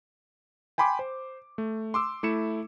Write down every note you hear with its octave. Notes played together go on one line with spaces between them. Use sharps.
G5 G#5 B5 C6 D6
C5
A3
C6 D6 E6
A3 E4 C#7 E7